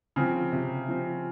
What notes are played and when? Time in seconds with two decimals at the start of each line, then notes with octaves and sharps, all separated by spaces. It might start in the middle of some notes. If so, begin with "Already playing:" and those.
0.16 C#3 F3 C4
0.53 C3
0.88 F3 C4